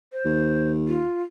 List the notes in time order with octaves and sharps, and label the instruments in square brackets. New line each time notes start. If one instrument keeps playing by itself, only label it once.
[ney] C5
[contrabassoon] D#2
[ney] F4